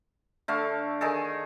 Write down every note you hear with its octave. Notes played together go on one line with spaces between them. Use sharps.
D3 A3 F5
D#3 G#4 A4